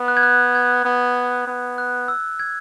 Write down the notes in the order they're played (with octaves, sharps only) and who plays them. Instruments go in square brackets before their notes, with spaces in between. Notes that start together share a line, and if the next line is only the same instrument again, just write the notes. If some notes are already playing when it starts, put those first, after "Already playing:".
Already playing: [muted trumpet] B3
[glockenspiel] F#6
G#6
F#6
G#6
[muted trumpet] B3
B3
[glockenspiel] F#6
E6
G#6